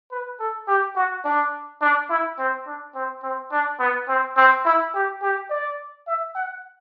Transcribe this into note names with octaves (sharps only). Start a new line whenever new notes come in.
B4
A4
G4
F#4
D4
D4
E4
C4
D4
C4
C4
D4
B3
C4
C4
E4
G4
G4
D5
E5
F#5